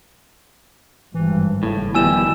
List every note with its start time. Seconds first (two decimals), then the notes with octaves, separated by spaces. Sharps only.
1.14 G#1 G2 E3
1.63 F#1 A2
1.95 F2 B2 D#3 E3 G3 G#5 E6 E7